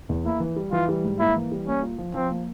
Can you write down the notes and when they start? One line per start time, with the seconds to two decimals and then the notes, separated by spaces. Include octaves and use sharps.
0.09 E2
0.25 A#3 E4
0.40 E3
0.56 G3
0.72 E3 F4
0.89 G3
1.04 G#2
1.20 A#3 E4
1.36 E3
1.52 G3
1.67 A#3 C#4
1.82 F4
1.98 F3
2.14 F3 C4
2.31 A#3